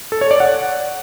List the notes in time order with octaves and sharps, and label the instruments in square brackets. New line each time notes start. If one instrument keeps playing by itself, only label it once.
[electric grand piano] A4
C#5
D5
F#5